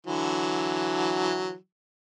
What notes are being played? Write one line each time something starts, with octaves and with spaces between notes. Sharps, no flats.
D3 E3 F#3